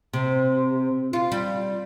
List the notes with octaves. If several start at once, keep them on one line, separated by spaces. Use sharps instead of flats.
C3
F4
G3